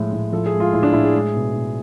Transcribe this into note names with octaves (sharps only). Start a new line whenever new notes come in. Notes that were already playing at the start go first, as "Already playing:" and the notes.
Already playing: A2 F3 G#3
A2
F3 A4
G#4
G#3
F4
A2 E4
D4
A2 E4
G#4
G#3
B2
B2